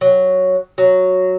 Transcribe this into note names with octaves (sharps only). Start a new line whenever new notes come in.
F#3
F#3